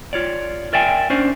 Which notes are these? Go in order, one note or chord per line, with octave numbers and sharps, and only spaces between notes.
F4 C#5 D5
A#4 D5 E5 G5 G#5
C#4 D4 C5 D5